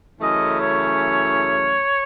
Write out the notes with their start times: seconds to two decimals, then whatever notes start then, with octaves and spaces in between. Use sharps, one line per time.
0.20 F#2 C#3 E3 A3 C#4 D#5
0.60 C#5